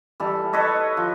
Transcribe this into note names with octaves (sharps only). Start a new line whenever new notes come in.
E3 G3 A4
A4 B4 C#5 D#5
F3